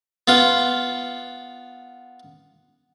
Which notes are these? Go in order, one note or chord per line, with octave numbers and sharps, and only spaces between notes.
B3 F4